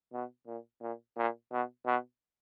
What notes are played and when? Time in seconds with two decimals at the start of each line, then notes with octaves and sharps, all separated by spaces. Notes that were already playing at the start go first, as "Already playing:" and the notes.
0.13 B2
0.47 A#2
0.81 A#2
1.17 A#2
1.52 B2
1.86 B2